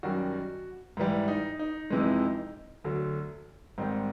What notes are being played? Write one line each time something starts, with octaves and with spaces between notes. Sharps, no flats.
F#2 D#3 G3 F#4
G#2 E3 G3
D#4
D#4
F2 C3 E3 G#3
D2 D3 F#3
G#2 D#3 G3 C4